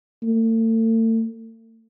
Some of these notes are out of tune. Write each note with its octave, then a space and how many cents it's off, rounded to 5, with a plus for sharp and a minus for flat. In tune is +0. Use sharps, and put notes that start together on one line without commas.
A3 +40